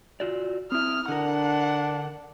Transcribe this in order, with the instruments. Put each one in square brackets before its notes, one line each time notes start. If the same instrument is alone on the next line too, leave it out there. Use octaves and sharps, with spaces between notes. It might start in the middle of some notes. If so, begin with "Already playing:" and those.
[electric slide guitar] F4 F#4 D5
[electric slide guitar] C4 E4 [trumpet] D#6 [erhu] F6
[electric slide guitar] D3 A#4 [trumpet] D4 [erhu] F#5